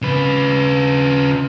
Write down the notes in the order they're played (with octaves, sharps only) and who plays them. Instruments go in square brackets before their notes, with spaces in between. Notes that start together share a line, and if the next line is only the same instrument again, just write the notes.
[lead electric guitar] C#3 B4